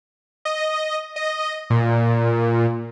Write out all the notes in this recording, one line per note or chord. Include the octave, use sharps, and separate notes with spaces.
D#5
D#5
A#2